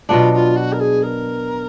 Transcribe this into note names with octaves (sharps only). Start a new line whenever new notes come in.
B2 F#3 B3 D4 F4
F4
F#4
A#4
G#4
A#4